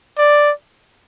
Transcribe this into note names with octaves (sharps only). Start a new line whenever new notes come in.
D5